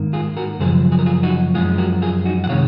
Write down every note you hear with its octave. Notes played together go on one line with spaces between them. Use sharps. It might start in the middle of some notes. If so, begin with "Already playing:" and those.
Already playing: G#2 D#3 A#3
F4 G#4
F#4 A#4
F#2 C#3 F3 G#4 C5
G#4
A#4
F4 G#4
D#4 F#4
F#2 F3 G#3 F4 G#4
F#4 A#4
F4 G#4
D#4 F#4
F#5
C3 D#3 G#3 C#5 F5